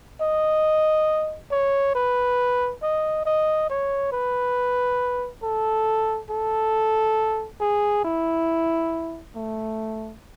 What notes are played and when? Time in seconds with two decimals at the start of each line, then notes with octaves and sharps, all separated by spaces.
0.21 D#5
1.51 C#5
1.95 B4
2.82 D#5
3.26 D#5
3.70 C#5
4.12 B4
5.43 A4
6.30 A4
7.61 G#4
8.05 E4
9.36 A3